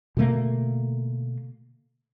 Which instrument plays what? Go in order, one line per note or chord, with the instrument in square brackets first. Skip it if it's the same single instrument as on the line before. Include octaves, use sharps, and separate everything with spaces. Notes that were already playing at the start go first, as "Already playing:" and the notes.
[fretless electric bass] B2 D3 A3 A#3